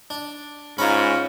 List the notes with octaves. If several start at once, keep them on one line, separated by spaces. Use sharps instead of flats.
D4
G#2 C#4 F4 A#5 B5